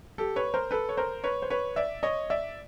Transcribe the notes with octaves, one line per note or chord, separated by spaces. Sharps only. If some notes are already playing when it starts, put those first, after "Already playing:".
G4 A4
B4 C#5
A#4 C5
A4 B4
C#5
A#4 C5
B4 C#5
C5
B4 C#5
D5 E5
C#5 D#5
D5 E5